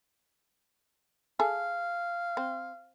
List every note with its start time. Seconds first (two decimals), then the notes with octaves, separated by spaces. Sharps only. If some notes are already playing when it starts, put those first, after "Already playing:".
1.40 G#4 A4 F5
2.37 C4